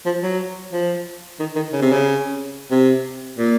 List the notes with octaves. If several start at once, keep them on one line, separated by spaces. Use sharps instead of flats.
F3
F#3
F3
D#3
D#3
C#3
C3
C#3
C3
A#2